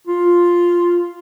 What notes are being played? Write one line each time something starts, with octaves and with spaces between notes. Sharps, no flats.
F4